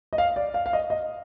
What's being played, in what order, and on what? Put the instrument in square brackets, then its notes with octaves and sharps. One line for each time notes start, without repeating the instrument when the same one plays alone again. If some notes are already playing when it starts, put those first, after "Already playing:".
[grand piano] D#5
F5
D5
F5
F5
D#5
D#5